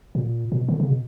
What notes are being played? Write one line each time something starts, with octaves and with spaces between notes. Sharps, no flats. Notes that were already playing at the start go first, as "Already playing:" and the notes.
A#2
A#2
B2
D3
C#3
B2